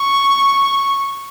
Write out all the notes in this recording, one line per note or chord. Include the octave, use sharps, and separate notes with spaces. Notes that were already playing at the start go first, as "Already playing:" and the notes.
Already playing: C#6